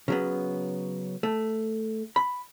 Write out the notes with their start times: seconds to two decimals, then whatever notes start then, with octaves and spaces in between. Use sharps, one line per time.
0.08 C#3 F#3 B3
1.23 A3
2.16 B5